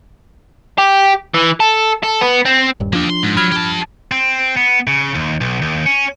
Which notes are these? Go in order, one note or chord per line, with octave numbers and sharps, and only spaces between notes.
G4
E3
A4
A4
B3
C4
D#1 G2
F3 A#3 D4 G4
C6
G#2
F#3 B5 F6 G#6
G4 A5
C4
B3
C#3
D#2
B1
D#2
C#4